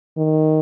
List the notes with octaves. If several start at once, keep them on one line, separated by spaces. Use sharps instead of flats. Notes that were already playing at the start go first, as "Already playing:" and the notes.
D#3